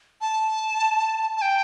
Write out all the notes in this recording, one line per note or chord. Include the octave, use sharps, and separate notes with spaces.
A5
A5
G5